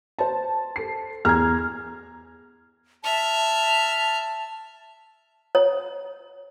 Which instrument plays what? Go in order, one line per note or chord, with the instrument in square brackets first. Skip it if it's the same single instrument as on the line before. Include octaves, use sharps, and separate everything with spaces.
[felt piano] C5 A5
[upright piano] A4 C7
[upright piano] E2 A#5 [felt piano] F6 G#6
[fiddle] E5 F6 [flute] A5
[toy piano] C#5